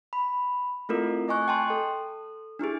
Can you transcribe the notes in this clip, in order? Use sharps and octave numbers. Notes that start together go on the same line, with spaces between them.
B5
A3 C4 E4 F4 A4 A#4
A3 D#5 G#5 C#6 F#6
G5 A5 C6
A4
D4 E4 G4 G#4